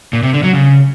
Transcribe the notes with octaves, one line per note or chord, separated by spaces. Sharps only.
A#2
C3
D3
F#3
C#3